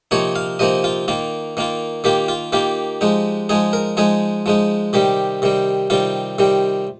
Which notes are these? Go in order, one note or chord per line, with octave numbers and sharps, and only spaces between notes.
C3 F3 A#3 D#4 C#5
F5
C3 F3 A#3 D#4 D#5
F4
D#3 A#3 F4
D#3 A#3 F4
D#3 A#3 F4 G4
F4
D#3 A#3 F4 G4
F3 G#3 D#4
F3 G#3 D#4 G#4
A#4
F3 G#3 D#4 G#4
F3 G#3 D#4
C3 D#3 G3 G4
C3 D#3 G3
C3 D#3 G3 F4
C3 D#3 G3